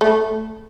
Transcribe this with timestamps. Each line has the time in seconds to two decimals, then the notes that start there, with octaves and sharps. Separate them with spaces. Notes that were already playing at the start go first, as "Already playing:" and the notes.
0.01 A3